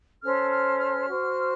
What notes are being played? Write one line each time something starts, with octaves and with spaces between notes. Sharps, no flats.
C#4 A4 C5 F6
F6
F6
F#4 C5